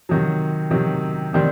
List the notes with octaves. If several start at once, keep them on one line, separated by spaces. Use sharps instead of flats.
C3 D#3 F#3
C3 D#3 F#3
C3 D#3 G3 C4